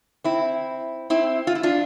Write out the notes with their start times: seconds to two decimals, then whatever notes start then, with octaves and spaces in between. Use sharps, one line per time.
0.24 C4 E4
1.10 C4 E4
1.47 F4
1.55 E4
1.63 D4 F4